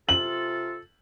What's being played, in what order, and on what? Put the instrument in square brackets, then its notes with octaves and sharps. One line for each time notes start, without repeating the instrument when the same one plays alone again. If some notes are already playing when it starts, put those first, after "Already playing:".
[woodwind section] C3 F4 A4 [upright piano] F#7